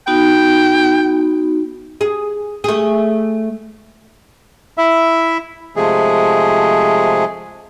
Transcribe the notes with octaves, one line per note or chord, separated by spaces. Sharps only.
B3 D#4 F#4 G5
G#4
A3 G#4
E4 E5
C3 F3 G#3 A3 G#4